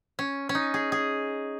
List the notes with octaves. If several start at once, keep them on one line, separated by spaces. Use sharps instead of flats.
C#4
C#4
D#4
G#4
G#4